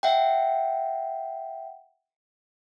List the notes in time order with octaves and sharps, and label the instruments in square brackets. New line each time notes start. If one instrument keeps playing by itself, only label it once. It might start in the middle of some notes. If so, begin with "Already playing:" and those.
[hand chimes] E5 F#5 G5